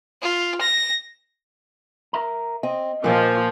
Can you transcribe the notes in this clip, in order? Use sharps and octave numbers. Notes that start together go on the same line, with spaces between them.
F4
A#6
A#4 E5 A#5
C4 D#5
A#2 F3 A#3